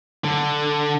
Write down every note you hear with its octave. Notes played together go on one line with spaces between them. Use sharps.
D3